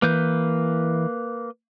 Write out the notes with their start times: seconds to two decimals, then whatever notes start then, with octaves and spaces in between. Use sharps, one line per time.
0.02 E3 A#3 B4 G6